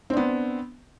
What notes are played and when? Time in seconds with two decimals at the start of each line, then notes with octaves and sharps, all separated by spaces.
0.10 C4
0.13 D4
0.17 B3